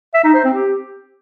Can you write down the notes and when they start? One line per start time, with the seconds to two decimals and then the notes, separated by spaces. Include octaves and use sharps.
0.14 E5
0.24 D#4
0.34 C5
0.44 C4
0.54 G4